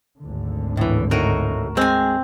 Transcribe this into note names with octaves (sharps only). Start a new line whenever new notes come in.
G#1 D2 D3
A2 E3
A2 D#4 F#4 A#4
G#3 C4 G#5